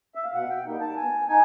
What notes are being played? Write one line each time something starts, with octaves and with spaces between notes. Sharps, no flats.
E5
F5
B2 F#5
G5
G3 A#3 D#4
A5
B2 G#5
D#4 G#5